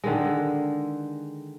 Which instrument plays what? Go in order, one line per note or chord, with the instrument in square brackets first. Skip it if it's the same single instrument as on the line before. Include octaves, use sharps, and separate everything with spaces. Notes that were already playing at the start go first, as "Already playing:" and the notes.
[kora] D3 D#3 G#3